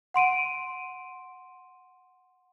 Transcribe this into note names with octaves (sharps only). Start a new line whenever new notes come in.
F#5 C6 D7 D#7